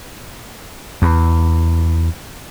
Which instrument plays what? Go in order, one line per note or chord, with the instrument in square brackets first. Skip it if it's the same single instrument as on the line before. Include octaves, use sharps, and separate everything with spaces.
[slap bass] E2